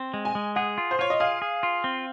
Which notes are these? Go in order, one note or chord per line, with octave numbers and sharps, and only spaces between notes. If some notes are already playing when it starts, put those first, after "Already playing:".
Already playing: C4
G#3
G#5
G#3
G#4 F#5
F4
C5
F4 C#5
D#5
G#4 F5
G#4
F4
C4